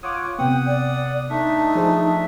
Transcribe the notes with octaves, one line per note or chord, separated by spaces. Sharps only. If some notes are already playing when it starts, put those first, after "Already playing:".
F4 C#5 F#5 D6 D#6
C3 B3 F#5 G5 D#6
D5
A3 D4 D#4 E5
F3 G#4 C5